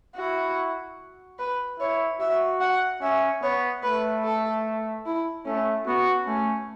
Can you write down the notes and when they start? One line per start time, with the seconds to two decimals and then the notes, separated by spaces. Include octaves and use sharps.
0.16 E4 F#4
1.39 B4
1.79 E4 C#5
2.20 F#4 E5
2.61 F#5
3.02 C#4 E5
3.42 B3 C#5
3.83 A3 B4
4.24 A4
5.06 E4
5.46 A3 C#4
5.87 B3 F#4
6.27 A3 C#4